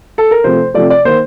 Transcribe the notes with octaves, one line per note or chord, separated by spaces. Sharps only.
A4
A#4
C3 F3 A3 C5
C3 F3 A3 D5
D5
D#3 A#3 C5